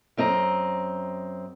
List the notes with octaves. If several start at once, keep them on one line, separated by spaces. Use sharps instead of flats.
F#2 C4 D#5 A#5